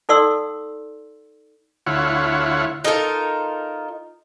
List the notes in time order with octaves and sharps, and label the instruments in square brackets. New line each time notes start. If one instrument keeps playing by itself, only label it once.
[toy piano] D#4 A4 D5 F#5 C6 E6
[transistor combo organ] D2 E4 F4 C#5 F#5
[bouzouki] D#4 F4 A4 A#4